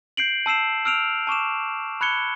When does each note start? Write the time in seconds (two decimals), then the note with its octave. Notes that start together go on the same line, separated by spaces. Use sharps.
0.17 G6 C7 D7 F#7
0.46 A5 E6 C7 E7
0.85 E6 F6 D7 F7
1.27 A5 C#6 D6 E7
2.01 B5 F#6 G#6 C#7 G7